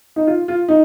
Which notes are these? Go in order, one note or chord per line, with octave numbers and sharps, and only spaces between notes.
D#4
F4
F4
D#4